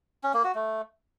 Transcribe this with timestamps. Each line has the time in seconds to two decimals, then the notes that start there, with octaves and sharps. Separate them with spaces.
0.24 C#4
0.34 A#3
0.44 F#4
0.55 A3